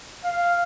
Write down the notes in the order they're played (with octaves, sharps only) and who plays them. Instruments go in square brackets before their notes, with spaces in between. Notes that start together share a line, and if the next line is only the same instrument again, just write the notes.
[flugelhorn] F5